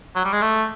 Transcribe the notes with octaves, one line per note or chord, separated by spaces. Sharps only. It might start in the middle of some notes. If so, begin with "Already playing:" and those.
F#3
G3
G#3
A3